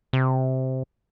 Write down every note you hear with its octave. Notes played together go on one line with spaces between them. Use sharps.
C3